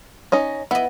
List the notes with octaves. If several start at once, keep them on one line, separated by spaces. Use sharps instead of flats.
C#4 D#4 D#5
B3 E4 D#5